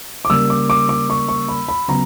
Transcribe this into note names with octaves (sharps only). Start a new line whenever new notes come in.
D6
C#3 G3 A#3 E6
D6
D6
D6
C#6
C#6
B5
B5
C#3 F#3 B3 A#5